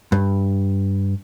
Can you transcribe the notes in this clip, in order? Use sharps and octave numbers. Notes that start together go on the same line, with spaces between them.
G2